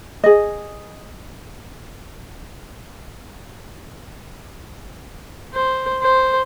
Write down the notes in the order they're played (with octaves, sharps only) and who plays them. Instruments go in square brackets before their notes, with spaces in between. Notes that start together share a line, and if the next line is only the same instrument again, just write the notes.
[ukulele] G#4 D#5
[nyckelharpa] C5
C5